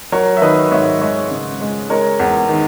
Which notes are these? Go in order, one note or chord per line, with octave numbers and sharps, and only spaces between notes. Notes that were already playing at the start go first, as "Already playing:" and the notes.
F#3 A#4 C#5
E5
D#3 B4 D#5
G#2 C#5 E5
G#3 C#5 E5
C#3
G#3
G#3 A#4 C#5
E2
D#3